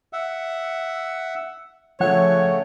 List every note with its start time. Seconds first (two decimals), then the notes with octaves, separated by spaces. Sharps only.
0.13 E5 F#5
2.00 C#3 F3 A3 C#5 F#5